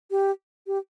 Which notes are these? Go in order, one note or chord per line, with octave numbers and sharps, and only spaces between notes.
G4
G4